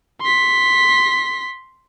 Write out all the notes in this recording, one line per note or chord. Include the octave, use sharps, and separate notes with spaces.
C6 B6